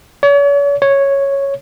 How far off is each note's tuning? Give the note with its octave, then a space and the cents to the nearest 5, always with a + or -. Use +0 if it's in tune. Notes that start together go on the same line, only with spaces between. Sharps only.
C#5 +40
C#5 -5